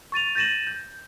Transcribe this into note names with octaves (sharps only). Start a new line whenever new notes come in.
C#6 A6 D#7 F7
G6 A6 A#6 D#7 E7 F#7
G6